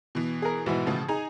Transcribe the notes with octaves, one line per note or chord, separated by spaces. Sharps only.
B2 E3
G#4 A#4
G#2 B2 E3
A2 C#3 F3
D#4 G#4 G#5 A#5